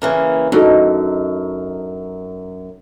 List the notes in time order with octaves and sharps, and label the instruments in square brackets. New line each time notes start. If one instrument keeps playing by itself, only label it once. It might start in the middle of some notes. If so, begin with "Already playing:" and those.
[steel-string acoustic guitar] C#3 E3 A#3
[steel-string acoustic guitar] F#2 [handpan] D4 D#4 A4